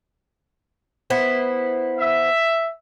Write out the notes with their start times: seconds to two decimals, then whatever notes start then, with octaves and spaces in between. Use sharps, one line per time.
1.10 B3 E4 C5
1.99 E5